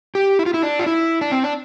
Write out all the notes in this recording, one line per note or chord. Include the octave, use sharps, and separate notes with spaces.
G4
E4
F4
E4
D4
F4
E4
D4
C4
D4